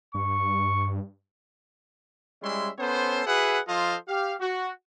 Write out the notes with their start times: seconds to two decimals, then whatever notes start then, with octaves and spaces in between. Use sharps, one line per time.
0.15 G2 C#6
2.42 G3 G#3 C#4 E4 E5 C6
2.79 B3 C#4 A4 C5
3.27 F#4 G#4 B4 E5 F#5
3.68 F3 F4 A4 C5 D#5 F5
4.08 G4 F5
4.40 F#4